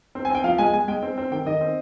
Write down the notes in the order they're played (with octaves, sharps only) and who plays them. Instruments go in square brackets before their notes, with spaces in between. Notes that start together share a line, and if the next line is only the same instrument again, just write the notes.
[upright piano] C4
G#5
C4 G5
F3 F5
G#3 G#5
G#3 G#5
G#3 G5
C4
C4
D#3 G5
D#3 D#5
C4